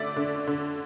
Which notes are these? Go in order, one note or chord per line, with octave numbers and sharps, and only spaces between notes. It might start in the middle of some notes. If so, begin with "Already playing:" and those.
Already playing: D3 A3 D5 E5
D3
D3